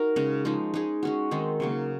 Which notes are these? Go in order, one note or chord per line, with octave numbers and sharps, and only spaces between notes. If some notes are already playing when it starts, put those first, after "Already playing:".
Already playing: D#4 F#4 A#4
C#3 G#3 C#4
F3 G#3 D#4
G#3 D#4 G#4
G#3 C#4 F#4
D#3 G#3 C4 D#4
C#3 F#3 A#3